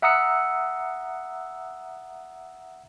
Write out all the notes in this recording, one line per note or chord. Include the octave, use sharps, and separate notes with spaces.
E5 F#5 A#5 D#6 E6 C#7